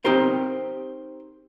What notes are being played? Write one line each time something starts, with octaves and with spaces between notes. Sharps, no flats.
C4 D#4 G4 A#4 C5 C#5